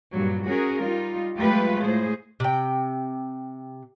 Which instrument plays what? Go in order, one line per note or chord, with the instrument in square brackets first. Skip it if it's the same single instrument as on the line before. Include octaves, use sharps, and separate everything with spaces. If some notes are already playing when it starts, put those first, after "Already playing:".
[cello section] G2 A#2 F#3
C#4 F#4 G#4 A#4
G3 D#4 F4
F#3 G#3 A3 F4 G4 B4
A2 G#4 C5
[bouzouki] C3 G5